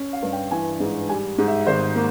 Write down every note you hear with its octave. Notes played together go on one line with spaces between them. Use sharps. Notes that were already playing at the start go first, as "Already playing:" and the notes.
Already playing: C#4
F5
G2
G5
E3 G#5
G#2
G3 G#5
G#2
E5
G#1 C5
A#3